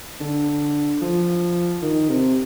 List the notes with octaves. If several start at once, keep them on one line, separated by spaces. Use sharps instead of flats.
D3
F3
D#3
C3